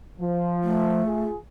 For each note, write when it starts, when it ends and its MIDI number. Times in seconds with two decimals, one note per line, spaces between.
0.20 1.04 53
0.63 1.24 57
1.05 1.35 65
1.05 1.35 68